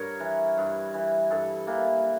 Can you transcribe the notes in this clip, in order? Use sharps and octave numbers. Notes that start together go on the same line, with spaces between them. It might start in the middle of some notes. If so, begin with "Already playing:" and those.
Already playing: G2 A#4 C#5
E3
G2
E3
G2 A4
E3 A#3